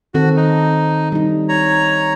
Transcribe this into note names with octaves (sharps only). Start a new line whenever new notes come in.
D#3 C4 F#4 A4
D#4
G3 D#4
C#5 A#5